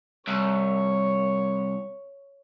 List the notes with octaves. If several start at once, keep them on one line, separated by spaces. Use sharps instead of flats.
C2 C#5